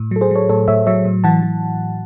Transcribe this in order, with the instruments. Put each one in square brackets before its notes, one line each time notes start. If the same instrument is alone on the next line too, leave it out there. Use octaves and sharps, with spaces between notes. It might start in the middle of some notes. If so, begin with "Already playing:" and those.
Already playing: [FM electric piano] A2
F#3 A4
G#4 C5
F#3 A4 C#5
A2 A4 C#5
A2 C#5 E5
F#3 C#5 E5
A2
E3 F#5 A5
E3